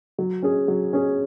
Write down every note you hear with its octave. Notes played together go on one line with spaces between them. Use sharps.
F#3
C#4 G#4
F#3
C#4 G#4